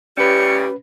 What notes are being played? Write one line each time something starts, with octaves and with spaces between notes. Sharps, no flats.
A2 C#3 G3 C#4 G4 B4 C#7